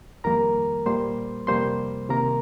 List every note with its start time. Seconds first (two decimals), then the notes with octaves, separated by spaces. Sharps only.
0.24 F2 D#3 G3 A#3 A#4 A#5
0.86 A#2 G3 A#3 C5 C6
1.47 F2 C3 G3 A#3 C5 C6
2.10 C3 D#3 A#3 A#4 A#5